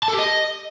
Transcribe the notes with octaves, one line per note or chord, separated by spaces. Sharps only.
A5
A4
G4
D#5